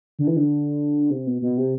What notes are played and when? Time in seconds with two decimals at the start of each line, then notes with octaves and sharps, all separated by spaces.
0.19 D3
0.27 E3
0.36 D3
1.10 C3
1.27 B2
1.42 B2
1.58 C3